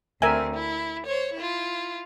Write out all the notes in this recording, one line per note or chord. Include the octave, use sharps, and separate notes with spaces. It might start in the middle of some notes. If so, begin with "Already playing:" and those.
D2 C4 A#4 E5 G#5
E4
C5 C#5
E4 F4